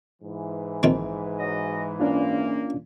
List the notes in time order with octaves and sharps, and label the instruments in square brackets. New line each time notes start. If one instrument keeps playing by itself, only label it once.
[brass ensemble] G#2 E3
[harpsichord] A#1 D#3 C4
[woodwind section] F#3 D#5
[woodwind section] A#2 A#3 [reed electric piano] C#4 D4 F4